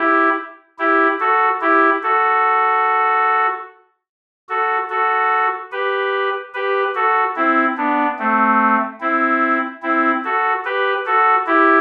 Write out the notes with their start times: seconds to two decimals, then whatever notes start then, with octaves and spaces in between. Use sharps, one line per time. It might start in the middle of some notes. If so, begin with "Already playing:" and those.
Already playing: E4 G4
0.79 E4 G4
1.20 F#4 A4
1.61 E4 G4
2.03 F#4 A4
4.49 F#4 A4
4.90 F#4 A4
5.72 G4 B4
6.54 G4 B4
6.95 F#4 A4
7.36 C4 E4
7.77 B3 D4
8.19 A3 C4
9.01 C4 E4
9.82 C4 E4
10.24 F#4 A4
10.65 G4 B4
11.06 F#4 A4
11.47 E4 G4